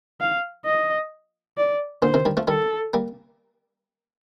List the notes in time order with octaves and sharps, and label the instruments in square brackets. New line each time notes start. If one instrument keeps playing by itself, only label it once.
[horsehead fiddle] F5
D#5
D5
[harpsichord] A#2 D3 [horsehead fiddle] C5
[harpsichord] C3 D#3
D#3 G3
F3 A3
[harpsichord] D#3 G3 [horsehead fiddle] A4
[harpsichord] G3 A#3